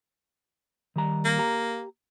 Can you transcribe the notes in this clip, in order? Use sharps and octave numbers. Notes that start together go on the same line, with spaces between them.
D#3 G3 A#5
A#3
G4 A#5